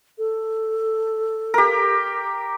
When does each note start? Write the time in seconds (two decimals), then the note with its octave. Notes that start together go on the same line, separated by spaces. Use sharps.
0.18 A4
1.54 G4 A#4